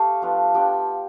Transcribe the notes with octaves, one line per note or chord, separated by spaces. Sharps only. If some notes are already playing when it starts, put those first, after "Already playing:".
Already playing: A3 G4 A4 F5
F3 B3 D4 F4
F3 B3 D4 F4 G4 G5